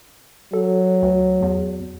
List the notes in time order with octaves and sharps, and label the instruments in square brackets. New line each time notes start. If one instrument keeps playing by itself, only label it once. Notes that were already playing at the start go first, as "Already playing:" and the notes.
[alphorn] F#3 [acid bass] A4
[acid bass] D2
E2